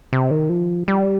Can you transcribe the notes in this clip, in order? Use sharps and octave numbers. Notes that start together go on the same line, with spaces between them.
C3
D#3
F3
G3